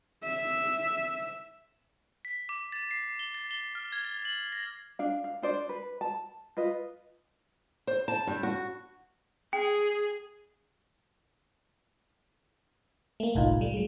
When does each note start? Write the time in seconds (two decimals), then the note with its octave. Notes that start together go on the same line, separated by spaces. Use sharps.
0.23 E5
2.25 B6
2.49 D6
2.72 A6
2.91 C7
3.19 G7
3.35 A6
3.51 G7
3.75 F6
3.92 G#6
4.05 A6
4.25 F#7
4.52 A#6
4.99 D4 F5
5.24 F5
5.42 D4 C5 D5
5.69 B4
6.01 A5
6.57 F4 B4 D#5
7.87 C5
8.08 A5
8.27 G2
8.43 F#4
9.53 G#4 G5
13.20 A3 A#3
13.35 G1 C2 A2 D#4 F4
13.61 G3 A3
13.74 F#3 G#3